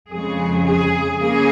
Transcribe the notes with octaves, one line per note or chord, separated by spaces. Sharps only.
F2 C#3 G#3 G#4
G#4
C#3 A#3 G#4